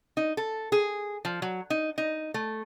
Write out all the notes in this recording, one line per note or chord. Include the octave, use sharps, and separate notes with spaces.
D#4
A4
G#4
F3
F#3
D#4
D#4
A3